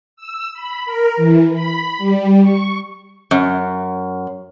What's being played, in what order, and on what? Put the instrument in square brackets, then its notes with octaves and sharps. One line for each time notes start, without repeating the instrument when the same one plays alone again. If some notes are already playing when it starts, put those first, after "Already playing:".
[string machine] E6
B5
A#4
E3
B5
G3
C#6
[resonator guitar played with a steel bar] F#2